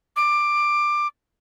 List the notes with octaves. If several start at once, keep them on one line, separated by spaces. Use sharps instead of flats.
D6